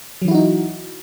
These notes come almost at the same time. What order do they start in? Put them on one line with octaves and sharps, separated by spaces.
F#3 E3 E4 F#4 D#4